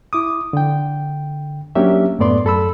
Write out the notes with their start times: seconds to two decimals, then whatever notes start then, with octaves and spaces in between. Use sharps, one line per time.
0.13 E4 D6 D#6
0.53 D3 G5
1.75 F#3 A#3 C#4 D4 G4 E5
2.19 F#2 A2 A3 B3 D5 C6
2.44 F#2 A4 B5 E6